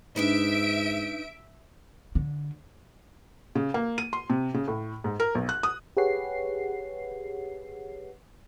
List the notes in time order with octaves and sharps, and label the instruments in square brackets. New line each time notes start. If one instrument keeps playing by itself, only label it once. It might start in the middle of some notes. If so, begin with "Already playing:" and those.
[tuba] G#2 [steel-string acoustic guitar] D4 D#4 B4 [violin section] E5 D7
[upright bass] D3
[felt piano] C#3
A#3
D#7
C6
C3
C#3
A2
G#2
A#4
B1
F#6
D#6
[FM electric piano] G4 G#4 B4 C#5 F#5 C7